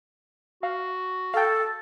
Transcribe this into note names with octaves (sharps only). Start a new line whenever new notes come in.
F#4 F5
A4 F5 G5